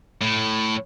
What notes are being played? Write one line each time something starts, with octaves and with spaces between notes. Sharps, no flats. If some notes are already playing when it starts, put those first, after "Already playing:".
A2